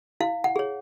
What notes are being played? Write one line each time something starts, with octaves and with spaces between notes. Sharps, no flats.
E4 F5
F#5
G#4 C#5